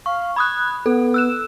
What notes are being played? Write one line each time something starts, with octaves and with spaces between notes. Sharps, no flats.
F5 C#6
B5 D#6 F#6 G#6
B3 A4
E6 F#6 E7